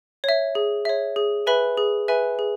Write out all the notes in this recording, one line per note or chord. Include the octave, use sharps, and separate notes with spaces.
C#5 E5
G#4
C#5 E5
G#4
B4 E5 G#5 B5
G#4
B4 E5 G#5 B5
G#4